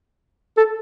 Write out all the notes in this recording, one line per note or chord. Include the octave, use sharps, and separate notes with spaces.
A4